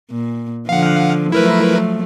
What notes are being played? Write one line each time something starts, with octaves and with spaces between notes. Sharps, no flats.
A#2
D3 F3 F5 F#5
F3 F#3 A3 E4 A#4 B4